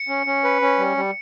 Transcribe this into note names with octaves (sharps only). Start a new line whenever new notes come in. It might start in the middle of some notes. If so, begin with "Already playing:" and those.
Already playing: C#7
C#4
C#4
B4
C#4
G3
G3